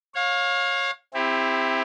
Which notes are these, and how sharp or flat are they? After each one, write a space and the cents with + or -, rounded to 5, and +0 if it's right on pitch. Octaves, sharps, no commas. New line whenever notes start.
C#5 -15 F5 +25
C4 +0 E4 +0 G4 +35